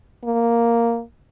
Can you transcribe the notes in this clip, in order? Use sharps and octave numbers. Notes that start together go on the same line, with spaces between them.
A#3